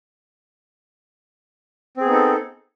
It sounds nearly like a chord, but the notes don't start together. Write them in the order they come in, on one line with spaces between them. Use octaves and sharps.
C4 G#4 B3 D#4 A4